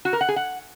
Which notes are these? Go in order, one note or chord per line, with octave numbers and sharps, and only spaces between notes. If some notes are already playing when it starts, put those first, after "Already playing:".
F#4
A#4
F#5
G#4
F#5